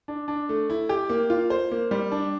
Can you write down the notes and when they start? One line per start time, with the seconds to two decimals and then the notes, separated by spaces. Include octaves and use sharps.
0.08 D4
0.28 D4
0.49 A3
0.70 E4
0.89 G4
1.10 A#3
1.30 F4
1.50 C5
1.71 A#3
1.91 G3
2.12 D4